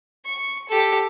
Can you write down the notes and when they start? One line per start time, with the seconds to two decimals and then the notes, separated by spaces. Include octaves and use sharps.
0.25 C#6
0.69 G4 A4